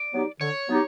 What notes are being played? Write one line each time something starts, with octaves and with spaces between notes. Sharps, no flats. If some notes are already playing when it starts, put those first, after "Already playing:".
Already playing: D5
F#3 B3 D#4 G4
D3 C#5
F#3 B3 D#4 G4